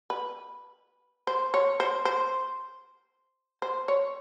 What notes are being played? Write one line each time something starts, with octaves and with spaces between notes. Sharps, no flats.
B4
C5
C#5
C5
C5
C5
C#5